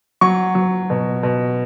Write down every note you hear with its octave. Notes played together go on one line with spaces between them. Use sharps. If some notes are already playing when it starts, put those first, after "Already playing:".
F#3 C#6
F#3
B2
B2